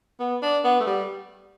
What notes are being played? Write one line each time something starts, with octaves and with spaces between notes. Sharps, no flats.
B3
D4
B3
A3
G3